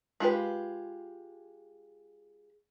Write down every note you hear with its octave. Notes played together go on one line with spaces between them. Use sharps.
G#3 F4 G4 B4